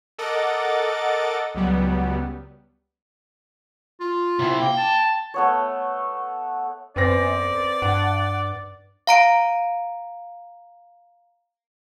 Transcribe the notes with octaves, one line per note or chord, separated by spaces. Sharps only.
A4 A#4 D#5 F#5 D6 A6
C#2 F#3 G3 B3
F4
C3 E4
A#3 G5
A5
A3 B3 C#5
F#2 B3 C4 D5 A#6
G2 F#5
F5 A#5 D7